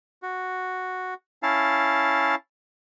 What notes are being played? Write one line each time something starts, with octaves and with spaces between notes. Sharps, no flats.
F#4
C#4 E4 F5 A5